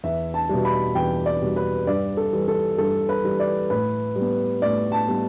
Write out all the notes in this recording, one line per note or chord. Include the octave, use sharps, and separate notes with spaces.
E2 E5
A5
B2 G3
B5
E2 G5
D5
B2 G3
B4
G2 D5
A4
E3 G3
A4
G2 A4
B4
E3 G3
D5
A2 B4
G3 B3
A2 D5
A5
G3 B3